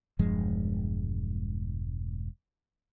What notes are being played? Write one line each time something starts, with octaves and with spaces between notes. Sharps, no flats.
E1 G2 F3 G#3